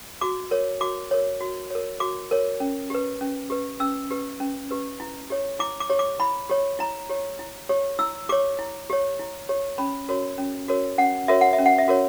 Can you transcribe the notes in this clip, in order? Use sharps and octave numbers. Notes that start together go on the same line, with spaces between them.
F#4 D6
A#4 C#5
F#4 D6
A#4 C#5
F#4
A#4 C#5
F#4 D6
A#4 C#5
C#4
G4 B4
C#4
G4 B4
C#4 E6
G4 B4
C#4
G4 B4
E4
G4 C#5
E4 D6
D6
G4 C#5
D6
E4 B5
G4 C#5
E4 A#5
G4 C#5
E4
G4 C#5
E4 E6
G4 C#5 D6
E4
G4 C#5
E4
G4 C#5
C#4 B5
F#4 A#4 C#5
C#4
F#4 A#4 C#5
C#4 F#5
F#4 A#4 C#5 E5
F#5
E5
C#4
F#5
E5
F#4 A#4 C#5